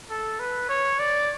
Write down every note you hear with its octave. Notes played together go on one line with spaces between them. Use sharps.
A4
B4
C#5
D5